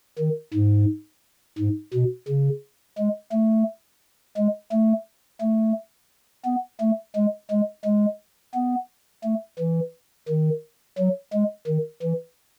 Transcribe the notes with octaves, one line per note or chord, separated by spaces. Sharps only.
D#3
G#2
G#2
B2
C#3
G#3
A3
G#3
A3
A3
B3
A3
G#3
G#3
G#3
B3
A3
E3
D#3
F#3
G#3
D#3
E3